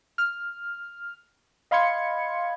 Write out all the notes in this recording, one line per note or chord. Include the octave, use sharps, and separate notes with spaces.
F6
D#5 F5 B5 C6 G#6 C#7